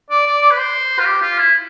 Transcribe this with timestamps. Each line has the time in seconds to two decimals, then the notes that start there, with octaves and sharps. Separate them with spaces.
0.10 D5
0.27 D5
0.42 D5
0.51 B4
0.58 C5
0.99 F4
1.05 G4
1.22 F4
1.38 E4